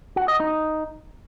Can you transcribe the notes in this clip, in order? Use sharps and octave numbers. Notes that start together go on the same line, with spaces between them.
F#4
D#5
D#4